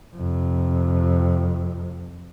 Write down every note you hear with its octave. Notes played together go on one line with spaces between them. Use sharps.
F2 C3